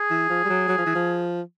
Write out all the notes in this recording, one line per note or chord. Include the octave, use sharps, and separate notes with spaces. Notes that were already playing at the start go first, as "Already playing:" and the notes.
Already playing: G#4
E3
F3
G3
F#3
F#3
F3
E3
F3